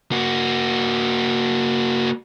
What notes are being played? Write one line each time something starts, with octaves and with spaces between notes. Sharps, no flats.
A#3 F#4